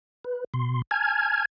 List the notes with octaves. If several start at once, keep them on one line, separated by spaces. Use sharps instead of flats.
B4
B2 C6
G#5 A5 F6 G#6